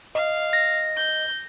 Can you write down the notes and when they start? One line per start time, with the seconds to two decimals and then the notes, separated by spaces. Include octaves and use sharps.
0.15 D#5 F5
0.53 A#6
0.97 G6